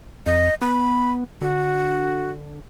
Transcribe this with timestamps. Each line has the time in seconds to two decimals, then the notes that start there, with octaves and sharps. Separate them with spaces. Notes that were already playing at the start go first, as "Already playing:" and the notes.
0.26 F2 D#5
0.62 B3 B5
1.41 D3 F#4